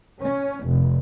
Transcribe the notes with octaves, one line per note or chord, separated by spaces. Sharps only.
C#4
F1